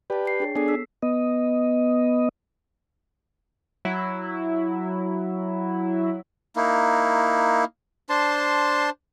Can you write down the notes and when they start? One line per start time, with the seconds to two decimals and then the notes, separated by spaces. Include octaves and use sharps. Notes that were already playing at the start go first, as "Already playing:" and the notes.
0.10 G4 B4 D5 A5
0.25 G5 C7
0.40 D4 G#4 C#5
0.55 B3 D4 G#4 A4 C7
0.68 E6 B6
1.03 B3 D#5
3.85 F#3 E4
6.56 A#3 D#4 E4
8.10 D4 C5 A5 C6